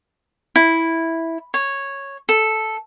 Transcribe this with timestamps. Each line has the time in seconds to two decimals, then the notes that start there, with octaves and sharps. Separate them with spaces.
0.56 E4
1.54 C#5
2.29 A4